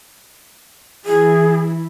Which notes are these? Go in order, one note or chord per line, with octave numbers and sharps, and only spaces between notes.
E3 E4 G#4